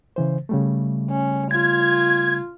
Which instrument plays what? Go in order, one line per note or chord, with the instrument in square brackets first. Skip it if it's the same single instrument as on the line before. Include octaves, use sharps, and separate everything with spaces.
[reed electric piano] C#3 E3 C5
C#3 G3 A3
[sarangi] C#4
[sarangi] F4 [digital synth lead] G#6